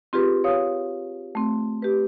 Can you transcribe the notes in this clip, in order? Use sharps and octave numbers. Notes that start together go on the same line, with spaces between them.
C4 F4 G4 G#4 B4
C#5 F5 D#6
A3 C4
G4 B4